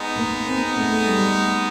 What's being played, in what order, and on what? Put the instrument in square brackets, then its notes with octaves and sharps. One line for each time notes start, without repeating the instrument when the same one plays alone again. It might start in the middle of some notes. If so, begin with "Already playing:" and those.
Already playing: [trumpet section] G#3 B3 D#4
[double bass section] A#3
C4
A3
G3